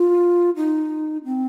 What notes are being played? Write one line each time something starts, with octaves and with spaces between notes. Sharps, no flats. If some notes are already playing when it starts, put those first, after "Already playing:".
Already playing: F4
D#4
C4